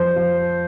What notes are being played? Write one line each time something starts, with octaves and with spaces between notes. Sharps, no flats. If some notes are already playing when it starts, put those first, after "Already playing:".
Already playing: F2 C5
F3